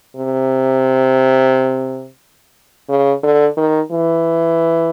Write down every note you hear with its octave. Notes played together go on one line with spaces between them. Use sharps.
C3
C#3
D3
D#3
E3